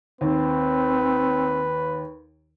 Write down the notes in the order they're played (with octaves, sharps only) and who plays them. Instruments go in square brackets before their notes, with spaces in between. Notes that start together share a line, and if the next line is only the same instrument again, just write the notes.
[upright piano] D#2 [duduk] C4 [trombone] B4